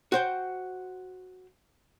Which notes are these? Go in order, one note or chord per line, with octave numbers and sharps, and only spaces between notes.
F#4 C5 G5